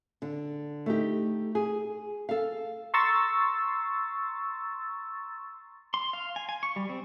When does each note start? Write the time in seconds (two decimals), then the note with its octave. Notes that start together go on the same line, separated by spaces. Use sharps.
0.22 D3
0.86 A3 D#4 G4
1.55 G#4
2.29 A4 F5
2.94 A#5 C6 C#6 E6 A6
5.94 C6
6.13 F5
6.36 G#5
6.49 G#5
6.63 C#6
6.76 G3
6.89 C4